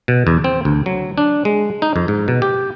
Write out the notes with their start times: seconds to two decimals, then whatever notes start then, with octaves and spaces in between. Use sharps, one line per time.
0.08 B2
0.27 E2
0.44 C4
0.65 D2
0.86 F#3
1.18 D4
1.45 G#3
1.82 D#4
1.96 F2
2.08 G#2
2.28 B2
2.42 G4